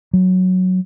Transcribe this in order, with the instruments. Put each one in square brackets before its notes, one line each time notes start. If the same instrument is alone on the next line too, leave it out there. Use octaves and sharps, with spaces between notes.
[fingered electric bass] F#3